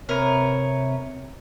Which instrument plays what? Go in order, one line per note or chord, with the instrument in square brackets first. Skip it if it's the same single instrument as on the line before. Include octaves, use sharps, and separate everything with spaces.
[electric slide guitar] C3 B4 [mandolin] A#4 [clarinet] C#5